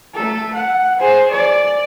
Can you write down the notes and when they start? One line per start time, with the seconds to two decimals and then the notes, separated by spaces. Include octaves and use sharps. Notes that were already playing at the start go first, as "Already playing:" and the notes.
0.14 A3 A4
0.54 F#5
0.99 G#4 C5
1.30 D5